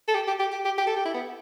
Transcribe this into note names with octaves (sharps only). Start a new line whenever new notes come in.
A4
G4
G4
G4
G4
G4
G4
A4
G4
E4
B3